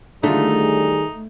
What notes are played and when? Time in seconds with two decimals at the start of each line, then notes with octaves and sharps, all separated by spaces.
0.23 D3 D#3 G3 A3 D#4 F4 G#4